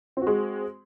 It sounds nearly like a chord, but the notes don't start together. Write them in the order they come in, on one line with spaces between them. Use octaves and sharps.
C4 F#4 G#3